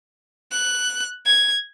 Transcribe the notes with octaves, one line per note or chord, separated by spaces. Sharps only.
F#6
G#6